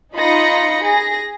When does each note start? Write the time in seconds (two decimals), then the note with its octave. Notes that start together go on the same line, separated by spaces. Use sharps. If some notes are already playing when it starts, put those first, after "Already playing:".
0.16 D#4 F4 D#5 B5 A#6 C#7
0.82 G#4 A#6